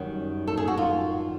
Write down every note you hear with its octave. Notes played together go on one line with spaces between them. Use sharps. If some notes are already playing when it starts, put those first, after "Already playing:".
Already playing: F#2 D#3 G3
A4
G#4
F#4
F4